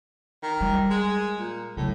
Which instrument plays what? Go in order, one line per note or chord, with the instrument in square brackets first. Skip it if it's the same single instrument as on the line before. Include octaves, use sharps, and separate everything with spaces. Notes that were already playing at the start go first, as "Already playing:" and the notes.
[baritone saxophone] D#3
[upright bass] G3
[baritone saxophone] G#3
A#2
[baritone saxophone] A2 [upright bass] C#3 F#3